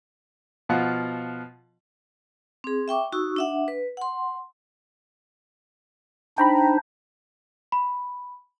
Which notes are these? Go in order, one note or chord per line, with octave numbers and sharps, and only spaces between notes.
B2 F3 F5 F#5
C4 G#4
E5 G5 C#6 D6
D#4 F#4 C#6 E6
D4 E5 F#5
B4
F#5 C6
D4 D#4 C5 G5 A#5 B5
B5